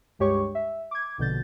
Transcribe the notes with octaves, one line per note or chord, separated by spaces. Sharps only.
C#2 G2 G#3 G4 C#5 C#6
E5
D6 G#6
A#1 B2 D3 G6 A6